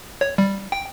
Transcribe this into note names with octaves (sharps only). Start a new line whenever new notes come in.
C#5
G3
G5